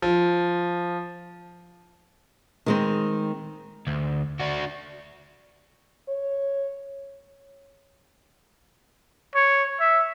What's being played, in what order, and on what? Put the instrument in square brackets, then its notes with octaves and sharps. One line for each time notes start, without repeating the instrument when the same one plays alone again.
[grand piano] F3
[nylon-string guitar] D#3 G#3 C4
[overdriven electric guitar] D2
D4 F#4
[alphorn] C#5
[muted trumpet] C#5
E5